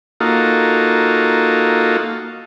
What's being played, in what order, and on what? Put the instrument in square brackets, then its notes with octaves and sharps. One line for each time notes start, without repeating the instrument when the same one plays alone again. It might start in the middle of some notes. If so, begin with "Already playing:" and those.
[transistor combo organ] A#3 D#4 F4 F#4 A4